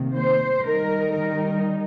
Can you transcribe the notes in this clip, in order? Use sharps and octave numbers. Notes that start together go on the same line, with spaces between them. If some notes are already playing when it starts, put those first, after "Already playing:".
Already playing: C3 D#3 A#3
C5
D#3 G3 D#4 A#4
A#4